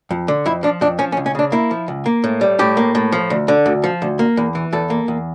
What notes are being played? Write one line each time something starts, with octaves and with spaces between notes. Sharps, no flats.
F2
D3
F2 E4
F3 D4
F2 D4
F3 C#4
C#4
C#2
C#4
C#3 D4
A#3 E4
F3
C#2
A#3
A2
G3
A2 G4
A#3
A2
F3
D2
D3
D2
F3
D2
A#3
E2
E3
E2 A4
A#3
E2